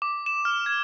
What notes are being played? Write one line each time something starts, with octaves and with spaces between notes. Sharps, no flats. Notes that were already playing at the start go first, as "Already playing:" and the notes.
D6
E7
F6
G#6